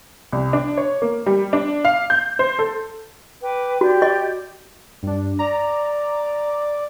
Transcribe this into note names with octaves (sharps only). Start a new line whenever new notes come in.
C2
D4
C#5
A#3
G3
D4
F5
G6
C5
A4
B4 G5 D6
F#4 G4 D5
D#5
G2 D4
D5 A#5